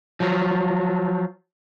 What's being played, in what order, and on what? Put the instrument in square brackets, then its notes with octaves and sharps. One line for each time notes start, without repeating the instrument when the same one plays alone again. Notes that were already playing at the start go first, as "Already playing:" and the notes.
[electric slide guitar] F3 F#3